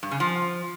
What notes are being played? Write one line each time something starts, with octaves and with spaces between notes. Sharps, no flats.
G2
C#3
F3